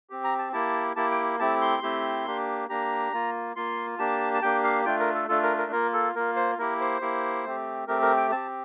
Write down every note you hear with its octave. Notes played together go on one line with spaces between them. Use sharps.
C4 G4
A#5
A5
A#3 E4 G4 A5
A#3 E4 G4 A5
G5
A3 C4 E4 G4 A5
C6
A3 C4 E4 G4
A#3 D4 G4
A#3 D4 G4 A#5
A#3 F4
A#3 F4 C6
A#3 D4 G4 A5
A5
A#3 D4 G4 G5
F5
A3 D4 F4 G5
A#4
A4
A3 D4 F4 A4
A#4
A#4
A#3 F4 A#4
A4
A#3 F4 A#4
C5
A#3 E4 G4 A#4
C5
A#3 E4 G4
A3 C4 G4
A3 C4 G4 A#4
A#4
G5
C4 G4 A5